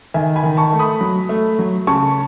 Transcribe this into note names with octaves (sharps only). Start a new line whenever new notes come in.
D#3 E5 G#5
G#5 B5
D#3
A5 C#6
A3
B5 D#6
F#3
A3
F#3
C#3 A5 C#6